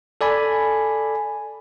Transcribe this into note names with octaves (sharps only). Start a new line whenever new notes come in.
A4 D5 G#5 B5